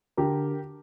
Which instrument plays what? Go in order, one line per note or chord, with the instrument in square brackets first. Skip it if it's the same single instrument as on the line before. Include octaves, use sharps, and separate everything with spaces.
[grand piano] D3 G4 A#4